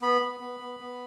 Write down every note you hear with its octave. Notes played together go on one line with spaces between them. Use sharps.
B3 B5
B3
B3
B3
B3